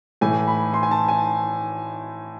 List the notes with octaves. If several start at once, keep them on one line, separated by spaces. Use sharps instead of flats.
A2 E3 A3 G#5
B5
C6
G#5
A5
G#5